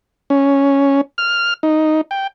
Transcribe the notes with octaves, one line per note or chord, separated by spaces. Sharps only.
C#4
F6
D#4
G5